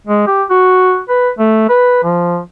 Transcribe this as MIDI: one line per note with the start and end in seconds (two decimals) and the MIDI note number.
0.07 0.26 56
0.27 0.43 67
0.50 1.00 66
1.09 1.29 71
1.39 1.65 57
1.69 2.03 71
2.04 2.39 53